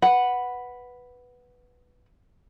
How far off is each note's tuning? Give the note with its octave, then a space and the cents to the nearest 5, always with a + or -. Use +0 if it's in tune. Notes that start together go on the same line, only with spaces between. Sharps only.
B4 +0 F#5 +0